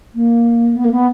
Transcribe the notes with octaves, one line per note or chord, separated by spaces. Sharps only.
A#3
B3
A#3
B3